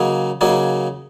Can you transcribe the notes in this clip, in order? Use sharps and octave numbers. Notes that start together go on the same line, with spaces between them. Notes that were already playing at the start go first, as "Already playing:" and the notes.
Already playing: C#3 F#3 A#3 D#4 G#4
C#3 F#3 A#3 D#4 G#4